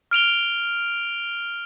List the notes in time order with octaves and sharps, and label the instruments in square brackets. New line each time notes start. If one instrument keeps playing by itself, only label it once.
[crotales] F6 D7 F7 G7